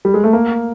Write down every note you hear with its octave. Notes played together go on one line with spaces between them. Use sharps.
G3
G#3
A3
A#3